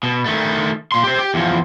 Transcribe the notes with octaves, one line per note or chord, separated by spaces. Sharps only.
B2
D#3 A3
A#2 C6
G4 C5
G4
E2 F3